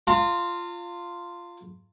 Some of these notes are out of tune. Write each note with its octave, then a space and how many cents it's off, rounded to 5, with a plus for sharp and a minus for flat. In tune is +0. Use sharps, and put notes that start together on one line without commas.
F4 -5 A#5 -45